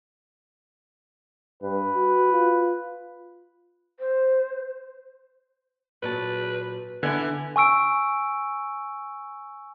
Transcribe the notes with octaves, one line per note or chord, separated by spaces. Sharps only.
G2 B4
F#4
F4
C5
A#2 F#3 B4 A5
D3 B3 E4 E5 G#5
G#5 C#6 E6 D7